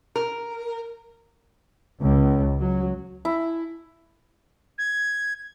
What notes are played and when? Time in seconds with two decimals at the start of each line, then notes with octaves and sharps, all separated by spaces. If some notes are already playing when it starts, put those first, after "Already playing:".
0.16 A#4
2.01 C#2
2.59 F#3
3.25 E4
4.78 G#6